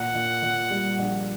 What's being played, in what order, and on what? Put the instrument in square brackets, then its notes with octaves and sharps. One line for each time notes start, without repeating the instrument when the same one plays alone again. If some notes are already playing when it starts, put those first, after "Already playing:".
Already playing: [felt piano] A#2 [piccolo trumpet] F#5
[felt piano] A#2
A#2
G3
A#1